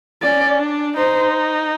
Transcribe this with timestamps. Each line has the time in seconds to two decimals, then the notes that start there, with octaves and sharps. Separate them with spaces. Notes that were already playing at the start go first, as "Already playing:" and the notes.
0.23 C#4 D5
0.59 D4
0.96 D#4 C5